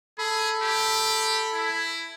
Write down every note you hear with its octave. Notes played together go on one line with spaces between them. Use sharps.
G#4 A4 B5
G4
E4